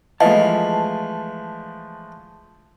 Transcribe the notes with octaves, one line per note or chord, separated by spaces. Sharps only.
E3 F3 G#3 A3 D#5 F5 A5